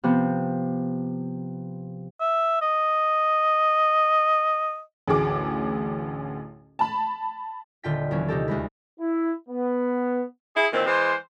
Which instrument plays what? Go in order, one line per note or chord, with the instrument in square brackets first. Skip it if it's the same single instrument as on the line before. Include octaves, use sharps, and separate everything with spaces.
[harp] C3 F3 B3 G6
[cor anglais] E5
D#5
[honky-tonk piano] A1 D2 G#4 D6
A5 B5
[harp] D#1 D3 F4 G5 B6
D#2 E3 F#3 C#4
C3 D#4 G4 A4
D2 G#3 B4
[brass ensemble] E4
B3
[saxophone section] E4 G#4
A#2 D#3 E3 C4
E3 G#3 C5